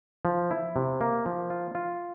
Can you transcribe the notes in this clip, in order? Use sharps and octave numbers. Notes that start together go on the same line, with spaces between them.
F3
E4
C3
A#3
F3
F4
F4